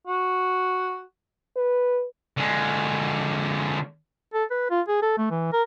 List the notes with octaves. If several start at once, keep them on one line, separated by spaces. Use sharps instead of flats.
F#4
B4
D3 G#3
A4
B4
F4
G#4
A4
A3
E3
A#4